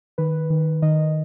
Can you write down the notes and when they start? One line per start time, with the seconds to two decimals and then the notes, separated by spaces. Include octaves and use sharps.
0.18 D#3 B4
0.50 D#3
0.82 D#3 D#5